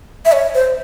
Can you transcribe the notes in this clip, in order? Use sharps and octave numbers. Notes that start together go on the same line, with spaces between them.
E5
C#5
C5